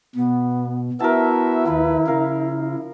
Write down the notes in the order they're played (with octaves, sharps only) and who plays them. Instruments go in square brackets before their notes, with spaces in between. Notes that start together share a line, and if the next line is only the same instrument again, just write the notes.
[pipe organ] B2 [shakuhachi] B3
[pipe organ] B3 F#4 E5 [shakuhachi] E4 [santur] A#4 A5
[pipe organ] D#2 B4 [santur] F3
[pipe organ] C#3 [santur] A#4 F5